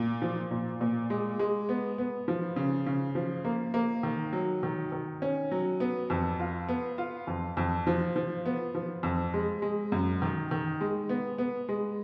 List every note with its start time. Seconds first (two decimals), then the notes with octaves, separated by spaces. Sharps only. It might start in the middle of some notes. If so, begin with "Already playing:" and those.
Already playing: A#2
0.22 F3
0.51 A#2
0.81 A#2
1.10 G#3
1.39 G#3
1.69 B3
1.98 B3
2.28 F3
2.56 C#3
2.86 C#3
3.15 F3
3.45 A#3
3.74 A#3
4.03 D#3
4.33 F#3
4.63 D#3
4.92 D#3
5.22 C#4
5.51 F#3
5.80 B3
6.10 F2
6.40 F4
6.68 B3
6.98 F4
7.27 F2
7.57 F2
7.87 F3
8.16 F3
8.46 B3
8.75 F3
9.03 F2
9.34 G#3
9.62 G#3
9.92 F#2
10.22 D#3
10.51 D#3
10.81 G#3
11.09 B3
11.38 B3
11.69 G#3